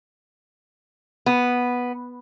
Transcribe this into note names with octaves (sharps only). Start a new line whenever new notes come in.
B3